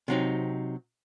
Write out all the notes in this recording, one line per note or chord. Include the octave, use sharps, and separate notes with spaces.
C3 F#3 C4 D#4